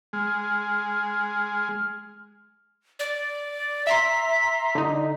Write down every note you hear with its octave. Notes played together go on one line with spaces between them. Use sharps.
G#3 F6
D5
E5 A#5 C6 B6
D3 D#4